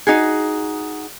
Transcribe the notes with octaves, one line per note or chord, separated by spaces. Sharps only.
D#4 F#4 G#4